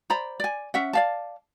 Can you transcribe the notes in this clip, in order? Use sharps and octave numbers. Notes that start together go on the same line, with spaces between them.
C5 D5 A#5 B5
D5 G#5
C#4 E5 F#5
D5 F5 A5